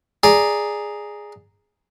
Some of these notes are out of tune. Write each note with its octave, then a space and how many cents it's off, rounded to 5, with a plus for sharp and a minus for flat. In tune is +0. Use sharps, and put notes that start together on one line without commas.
G#4 +0 D5 +0 A#5 +0